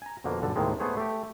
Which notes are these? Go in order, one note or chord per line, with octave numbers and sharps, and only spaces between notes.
G#5 A#5
F2 B2 D3 A#3
B1 G2 D3 A4
D#2 A2 C3 D#3 G#3
A3 B3 G#4 C5 C#5
A3 G4